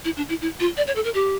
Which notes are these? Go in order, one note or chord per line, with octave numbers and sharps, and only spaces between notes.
E4
D4
E4
E4
F4
D5
C#5
A4
A#4
G4